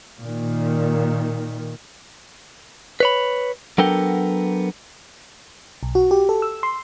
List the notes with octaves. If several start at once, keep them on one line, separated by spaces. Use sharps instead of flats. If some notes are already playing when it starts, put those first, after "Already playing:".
A#2 D#3
B4 C#5 B5
F#3 B3 D4 A4 A#4 G5
B1
F#4
G4
A4
E6
C6